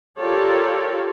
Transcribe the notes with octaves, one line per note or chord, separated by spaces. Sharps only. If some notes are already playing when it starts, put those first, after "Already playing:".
F4 G4 A4 A#4 C#5 D5